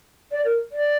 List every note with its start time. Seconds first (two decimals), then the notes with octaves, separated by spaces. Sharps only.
0.32 D5
0.45 A#4
0.72 D5